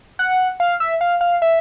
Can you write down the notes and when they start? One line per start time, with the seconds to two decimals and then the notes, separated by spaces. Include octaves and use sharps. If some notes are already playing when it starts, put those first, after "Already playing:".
0.19 F#5
0.60 F5
0.80 E5
1.01 F5
1.21 F5
1.42 E5